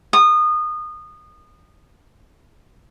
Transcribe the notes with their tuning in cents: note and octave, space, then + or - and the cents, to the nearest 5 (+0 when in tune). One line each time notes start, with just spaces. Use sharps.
D#6 -25